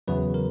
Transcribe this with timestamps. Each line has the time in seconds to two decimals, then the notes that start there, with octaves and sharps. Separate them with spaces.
0.08 E2 C#3 F#3 B4
0.34 A#4